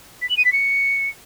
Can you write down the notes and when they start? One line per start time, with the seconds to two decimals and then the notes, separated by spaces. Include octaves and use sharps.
0.22 B6
0.29 F#7
0.37 D#7
0.45 B6
0.53 C#7